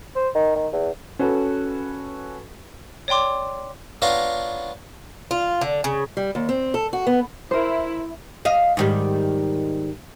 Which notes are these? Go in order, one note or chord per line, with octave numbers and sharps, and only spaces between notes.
C5
D#3
D#3
E2
C#4 F#4 A4 B4
C#5 D5 G5 C6 D6
B3 D4 F4 C#5 F5 A#5
F4
D3
C#3
G3
D#2
C4
A4
F#4
B3
E4 A#4 C5
D#5 F5
G#2 D#3 G3